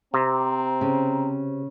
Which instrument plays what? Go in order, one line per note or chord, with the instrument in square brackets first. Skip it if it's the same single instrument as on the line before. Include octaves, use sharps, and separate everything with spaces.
[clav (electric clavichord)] C3 [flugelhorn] C4 [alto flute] A#5
[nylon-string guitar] C#3